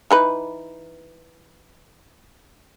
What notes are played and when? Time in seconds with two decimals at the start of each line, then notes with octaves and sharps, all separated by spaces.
0.11 E3 D#4 B4